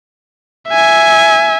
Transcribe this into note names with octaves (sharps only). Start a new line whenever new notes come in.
E5 G#5